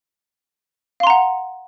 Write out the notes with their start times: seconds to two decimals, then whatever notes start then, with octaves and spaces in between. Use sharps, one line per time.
1.00 F5
1.03 C6
1.07 A#5
1.10 F#5